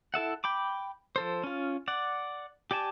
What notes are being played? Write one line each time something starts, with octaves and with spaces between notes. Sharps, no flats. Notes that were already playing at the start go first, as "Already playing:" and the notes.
E4 A4 E5 F#5
G5 B5 D6
F3 A4 C5
C#4 F4
D5 F#5
G4 D5 G#5 A5